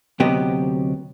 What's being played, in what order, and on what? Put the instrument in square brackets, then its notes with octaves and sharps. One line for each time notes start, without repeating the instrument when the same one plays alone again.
[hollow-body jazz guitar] D2 C3 F#3 B3 G4 D#5